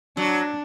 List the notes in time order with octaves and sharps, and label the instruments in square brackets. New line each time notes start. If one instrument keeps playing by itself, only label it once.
[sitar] F#3 [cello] D4